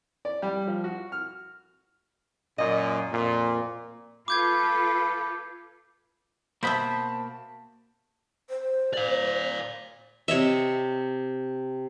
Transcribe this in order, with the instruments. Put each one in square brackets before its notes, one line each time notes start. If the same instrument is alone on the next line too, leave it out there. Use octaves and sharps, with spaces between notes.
[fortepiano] D5
G3
F3
F#4
F6
[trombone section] F#2 A#2 [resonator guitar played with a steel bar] D#5
[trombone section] F2 A#2
[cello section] F4 A4 B4 [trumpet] B5 [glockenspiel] D6 G6 G#6
[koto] B2 B3 E5 [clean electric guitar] A#3 F#4 B5 [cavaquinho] C5 [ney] A5
[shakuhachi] C5
[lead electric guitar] D5 F5
[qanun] C3 C#5 D#5 E5